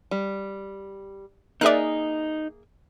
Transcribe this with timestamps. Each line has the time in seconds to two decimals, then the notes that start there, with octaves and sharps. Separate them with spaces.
0.11 G3
1.61 A#3 D#4 G#4 D5 E5 F#6